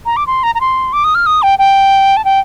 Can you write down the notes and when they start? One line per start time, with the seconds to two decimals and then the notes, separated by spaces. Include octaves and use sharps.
0.06 A#5
0.17 D6
0.27 C6
0.43 A#5
0.55 A#5
0.61 C6
0.93 D6
1.04 D#6
1.15 F6
1.26 D#6
1.42 G5
1.59 G5
2.17 A5
2.25 G5